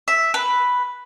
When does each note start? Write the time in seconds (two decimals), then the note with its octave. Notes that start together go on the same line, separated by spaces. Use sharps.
0.08 E5
0.34 B4